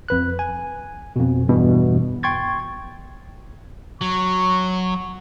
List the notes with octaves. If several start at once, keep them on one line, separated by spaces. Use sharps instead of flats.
F2 B4 F#6
G#5
F2 B2
E2 G2 B2 E3
G5 C6 C#6 G#6 A6
F#3 C#6